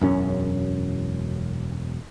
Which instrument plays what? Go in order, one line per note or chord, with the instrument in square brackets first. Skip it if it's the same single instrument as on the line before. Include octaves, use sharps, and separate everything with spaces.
[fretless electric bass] E1 F#2 C#4